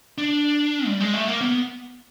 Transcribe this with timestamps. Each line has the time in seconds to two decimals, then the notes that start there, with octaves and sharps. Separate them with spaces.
0.18 D4
0.87 G3
1.00 G#3
1.14 A3
1.28 A#3
1.41 B3